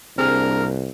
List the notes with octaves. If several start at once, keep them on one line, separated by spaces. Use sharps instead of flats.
C2 G3 A#3 C4 D4 G#4 A#4 F6